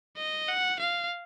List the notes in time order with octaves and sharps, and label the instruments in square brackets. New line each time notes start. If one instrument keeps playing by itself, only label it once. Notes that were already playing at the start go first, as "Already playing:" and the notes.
[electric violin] D#5
F#5
F5